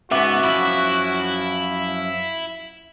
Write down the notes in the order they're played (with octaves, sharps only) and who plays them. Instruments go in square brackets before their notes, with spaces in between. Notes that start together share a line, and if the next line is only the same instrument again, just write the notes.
[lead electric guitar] G#2 C#3 [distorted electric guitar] B3 [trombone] F#4 [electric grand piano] E5 F#5 D6
[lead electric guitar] F#2 F3 [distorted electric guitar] E4